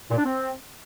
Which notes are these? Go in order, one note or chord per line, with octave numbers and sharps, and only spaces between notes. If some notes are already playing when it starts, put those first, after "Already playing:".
A#2
D4
C4